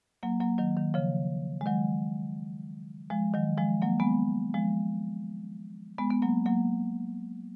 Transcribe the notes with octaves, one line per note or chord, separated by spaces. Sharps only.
F#3 A#3
F#3 A#3
D#3 F#3
D#3
C#3 F3
G#3
D#3 F#3
F3 G#3
D#3 F#3
F3 G#3
F#3 A#3
G#3 B3
F3 G#3
G#3 B3
B3
F#3 A#3
F#3 A#3